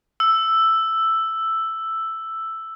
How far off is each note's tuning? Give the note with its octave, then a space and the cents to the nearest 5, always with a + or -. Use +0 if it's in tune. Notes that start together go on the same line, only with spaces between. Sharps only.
E6 +5